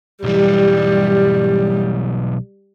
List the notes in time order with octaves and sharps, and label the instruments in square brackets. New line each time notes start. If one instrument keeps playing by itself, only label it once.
[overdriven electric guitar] B1 E3 [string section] G3